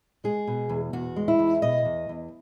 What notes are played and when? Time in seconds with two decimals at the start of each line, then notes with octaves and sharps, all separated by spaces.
0.24 G#3 G#4
0.47 B2
0.69 E2
0.93 E2 F#4
1.16 G#3
1.28 E4
1.39 E2
1.62 B2 D#5
1.85 E2
2.09 E2